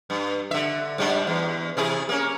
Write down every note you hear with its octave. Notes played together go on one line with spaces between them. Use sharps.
G2
D3 E5
G#2 G3 D4
E2
C3 E4 G#4
A#3 C#4